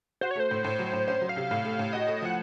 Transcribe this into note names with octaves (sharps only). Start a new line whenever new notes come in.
F#4 C5
C#5
A3 C5
A2
A2
F#3
A2
C#4 C5
F#3
F5
C3
A2
A3
A2
F#4 D#5
A3
F3 F#5